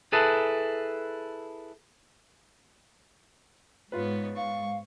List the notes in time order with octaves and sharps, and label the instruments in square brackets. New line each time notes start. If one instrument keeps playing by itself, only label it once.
[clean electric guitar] E4 G#4 A4 B4
[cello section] G#2 [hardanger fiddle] B3 C#5 [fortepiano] F4 B4
[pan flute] F5 [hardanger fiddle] C#6